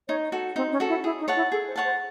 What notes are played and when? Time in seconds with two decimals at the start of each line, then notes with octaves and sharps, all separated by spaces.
0.08 D#4 C#5
0.32 F#4 A4
0.56 C4 D#4
0.72 C#4
0.80 F#4 A4
0.89 E4
1.04 E4 G#4
1.20 D#4
1.28 C#5 F#5 A5
1.36 E4
1.52 G#4 A4
1.68 C5
1.76 C#5 F#5 A5
1.85 C5